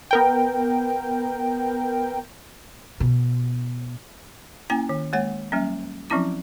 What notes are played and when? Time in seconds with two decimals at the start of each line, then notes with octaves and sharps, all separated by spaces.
0.11 B3 A#4 G5
3.00 B2
4.70 A#3 C#4 E4 G5 G#5
4.89 D#3
5.13 G#3 A#3 C#5 F#5
5.52 F#3 G3 A#3 C#4
6.10 F3 F#3 C4 C#4 E4 D6